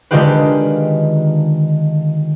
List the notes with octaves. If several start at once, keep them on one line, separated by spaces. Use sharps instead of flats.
D3 D#3 G#3 F4 G4 B4